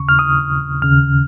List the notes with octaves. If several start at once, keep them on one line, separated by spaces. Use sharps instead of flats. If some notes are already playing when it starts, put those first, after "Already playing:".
Already playing: D#2 C#3 C#6
F6
D#6
D#2 C#3 F6